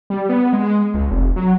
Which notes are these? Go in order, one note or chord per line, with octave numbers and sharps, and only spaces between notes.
G3
B3
G#3
C#2
F1
F#3